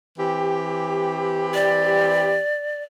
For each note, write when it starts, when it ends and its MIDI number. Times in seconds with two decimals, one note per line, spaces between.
0.19 2.40 52
0.19 2.40 60
0.19 2.40 67
1.55 2.82 74